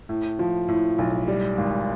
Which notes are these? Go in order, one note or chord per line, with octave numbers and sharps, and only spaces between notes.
A2
F3
A2
B1
G3
G#1